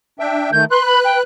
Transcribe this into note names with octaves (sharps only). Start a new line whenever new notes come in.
D4 E5 G5
D#3 A3 G6
B4 C6 F#6
B5
G5